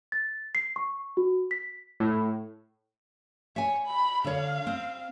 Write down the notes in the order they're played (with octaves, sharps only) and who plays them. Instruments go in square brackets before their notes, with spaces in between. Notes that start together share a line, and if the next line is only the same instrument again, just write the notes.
[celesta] A6
C7
C#6
F#4
B6
[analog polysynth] A2
[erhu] C#5 [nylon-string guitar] E5 G#5
[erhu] B5
[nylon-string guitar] D3 C#5 [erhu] F5
[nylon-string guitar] C4